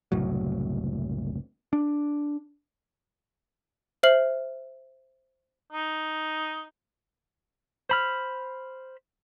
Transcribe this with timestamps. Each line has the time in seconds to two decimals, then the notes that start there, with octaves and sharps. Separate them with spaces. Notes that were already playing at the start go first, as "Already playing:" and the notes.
0.12 F#1 C2 A2 F#3
1.73 D4
4.03 C5 E5 F6 C7 F#7
5.72 D#4
7.89 C5 B5 F6